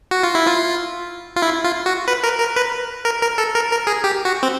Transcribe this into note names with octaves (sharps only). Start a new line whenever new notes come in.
F#4
F4
E4
F4
F4
E4
F4
F#4
B4
A#4
A#4
B4
A#4
A#4
A4
A#4
A#4
G#4
G4
F#4
C4